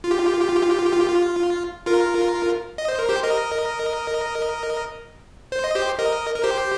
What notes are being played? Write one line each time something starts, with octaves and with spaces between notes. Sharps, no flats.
F4
G4
F4
G4
F4
G4
F4
G4
F4
G4
F4
G4
F4
G4
F4
F4 A#4
D#5
C5
A#4
G4 C5
A#4 D#5
C5
D#5
G4 C5
A#4 D#5
A#4
G4 C5